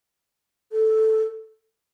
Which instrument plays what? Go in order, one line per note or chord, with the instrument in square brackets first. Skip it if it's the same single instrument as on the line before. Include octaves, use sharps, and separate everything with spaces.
[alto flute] A4